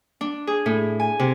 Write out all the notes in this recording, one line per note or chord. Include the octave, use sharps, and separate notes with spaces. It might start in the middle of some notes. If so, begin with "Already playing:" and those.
D4
G#4
A2
G#5
C3